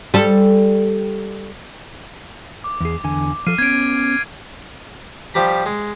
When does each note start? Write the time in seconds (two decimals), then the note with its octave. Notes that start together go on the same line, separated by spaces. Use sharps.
0.14 G3 A4
2.64 D6
2.81 E2 G#4
3.04 E2 D3 G#5
3.47 F3 A4 F6 C7 D#7
3.58 B3 C#4 G#6 D7
5.34 F3 G3 G4 A#5 B5
5.66 G#3